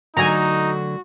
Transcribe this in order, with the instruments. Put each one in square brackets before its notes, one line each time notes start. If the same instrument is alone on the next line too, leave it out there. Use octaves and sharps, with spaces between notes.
[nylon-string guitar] D3 F#3 A3 [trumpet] D#4 [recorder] F#4 [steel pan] G#5 A#5